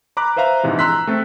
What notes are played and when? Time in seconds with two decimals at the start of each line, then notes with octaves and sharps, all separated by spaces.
0.17 A#5 B5 D6 F#6
0.36 B4 C5 E5 F5 A#5
0.63 A#1 G#2 C3 E3
0.79 A#5 C6 E6 F#6 B6
1.07 A3 C4 A4